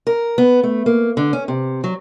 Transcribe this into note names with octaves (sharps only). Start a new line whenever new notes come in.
A#4
B3
A3
A#3
D3
C#4
C3
F#3